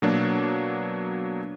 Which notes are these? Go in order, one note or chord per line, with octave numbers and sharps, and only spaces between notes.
B2 F#3 A#3 D4